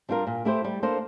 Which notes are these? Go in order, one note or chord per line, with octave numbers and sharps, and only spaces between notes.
G3 D4 F4 A#4
A#2
A3 E4 G4 C5
G3
A#3 D4 A4 C5